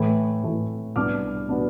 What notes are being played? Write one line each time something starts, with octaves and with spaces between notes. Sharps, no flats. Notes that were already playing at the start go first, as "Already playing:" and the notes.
Already playing: A2 E3 A3 E4
A2 E3 A3 E4
C2 B2 B3 D4 D6 F6
B2 B3 D4